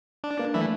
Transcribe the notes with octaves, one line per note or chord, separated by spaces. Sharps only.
D4
A#3
E3 A3 E4